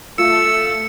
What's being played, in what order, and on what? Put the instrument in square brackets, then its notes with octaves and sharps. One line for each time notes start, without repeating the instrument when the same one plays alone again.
[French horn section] A3 [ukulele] F4 [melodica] E6 [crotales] C#7